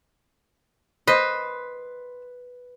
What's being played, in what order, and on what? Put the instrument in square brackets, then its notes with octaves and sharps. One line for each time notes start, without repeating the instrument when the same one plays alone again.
[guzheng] B4 [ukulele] C5 [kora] D#5